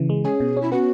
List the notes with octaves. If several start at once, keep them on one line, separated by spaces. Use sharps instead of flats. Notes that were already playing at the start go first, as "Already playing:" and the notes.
Already playing: C#3 E3
G#3
C#4 G#4
B2
C#4
E4
B3 F#4